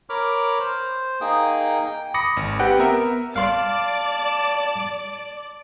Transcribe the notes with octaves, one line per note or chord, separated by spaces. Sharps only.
A#4 C#5 B5 D6 F6
C5
A#3 D#4 G#4 G5 D#6
G5
B5 D6 D#6 A#6 C#7
G#1
C4 G4 B4 F#5 G5
B3 A#4 E5
D5 F5 A5 C6